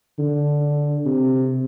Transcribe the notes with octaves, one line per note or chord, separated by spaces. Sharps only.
D3
C3